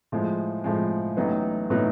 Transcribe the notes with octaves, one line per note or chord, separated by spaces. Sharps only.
A2 F3 G#3
A2 F3 G#3
A1 A2 F#3 B3 D#4
A2 F#3 B3 D#4